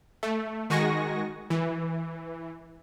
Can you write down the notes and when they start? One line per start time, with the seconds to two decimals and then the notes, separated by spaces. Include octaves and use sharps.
0.23 A3
0.70 D#3 G#3 F#4 G#5 C#6 A#6
1.50 E3